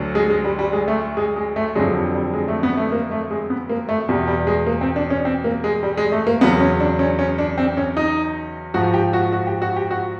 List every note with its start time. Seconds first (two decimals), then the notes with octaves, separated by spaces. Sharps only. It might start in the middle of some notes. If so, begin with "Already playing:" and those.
Already playing: D2 D3 F#3
0.15 G#3
0.30 G#3
0.44 G3
0.59 G3
0.73 G#3
0.88 A3
1.17 G#3
1.36 G#3
1.56 A3
1.76 F2 D3 F#3 G#3
1.95 G3
2.14 G3
2.34 G#3
2.48 A3
2.63 B3
2.77 A3
2.92 A#3
3.11 A3
3.31 G#3
3.50 B3
3.69 A#3
3.89 A3
4.09 E2 B2 G3
4.28 G3
4.47 G#3
4.66 A#3
4.81 C4
4.96 D4
5.10 C#4
5.25 C4
5.44 A#3
5.64 G#3
5.83 G3
5.98 G#3
6.12 A3
6.27 A#3
6.41 E2 C#3 F#3 B3
6.60 C#4
6.80 D4
6.99 C#4
7.19 C#4
7.38 D4
7.58 C4
7.77 C#4
7.97 D#4
8.74 G#2 F3 F#4
8.94 G4
9.13 F#4
9.32 F#4
9.47 G4
9.62 F#4
9.76 G4
9.91 F#4